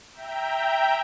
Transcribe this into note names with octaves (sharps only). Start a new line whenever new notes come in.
E5 G5 A#5 G6